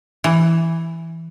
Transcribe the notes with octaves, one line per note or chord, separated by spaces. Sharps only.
E3